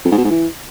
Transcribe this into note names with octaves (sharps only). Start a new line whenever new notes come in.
F2
G#2
B2
G#2
E3